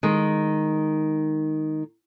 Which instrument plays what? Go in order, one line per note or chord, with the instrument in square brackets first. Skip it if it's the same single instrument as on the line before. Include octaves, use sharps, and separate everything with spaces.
[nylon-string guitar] D#3 G#3